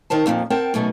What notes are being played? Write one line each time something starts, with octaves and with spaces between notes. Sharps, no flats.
D#3 A#4 C5 A5
F2 A#2 E3 F3
C4 A#4 F#5 G5 A5
F#2 B2 A3 D#4